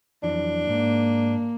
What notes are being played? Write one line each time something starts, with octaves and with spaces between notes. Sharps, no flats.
F2 E3 F#3 D4
G#2 A#3